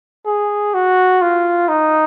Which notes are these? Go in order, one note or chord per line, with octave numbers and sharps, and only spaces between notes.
G#4
F#4
F4
D#4